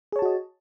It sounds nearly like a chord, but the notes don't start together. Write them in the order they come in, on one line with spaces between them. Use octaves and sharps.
G#4 C#5 A5 F#4 D#5